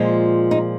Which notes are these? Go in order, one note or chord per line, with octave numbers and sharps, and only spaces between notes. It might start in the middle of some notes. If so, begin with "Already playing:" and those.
Already playing: A#2 F3 G#3
D#4